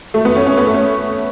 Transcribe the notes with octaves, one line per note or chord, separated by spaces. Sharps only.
A3
B3
C#4
C#4
B3
A3
C#4